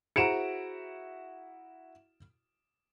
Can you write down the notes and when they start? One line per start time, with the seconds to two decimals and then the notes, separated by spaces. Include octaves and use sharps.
0.16 E4 F#4 G#4 C5 A#5 C#7 D7 E7